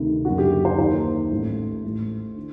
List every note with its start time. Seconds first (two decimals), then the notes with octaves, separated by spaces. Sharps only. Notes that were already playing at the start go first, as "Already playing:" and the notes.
Already playing: D2 C3 D#3
0.25 F#1 F#2 D3 F#4
0.38 G4
0.65 C5
0.78 D#2 D#3 C5
1.31 A1 A2
1.83 A1 A2
2.36 D3